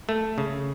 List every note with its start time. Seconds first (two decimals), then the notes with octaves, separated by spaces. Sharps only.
0.09 A3
0.38 C#3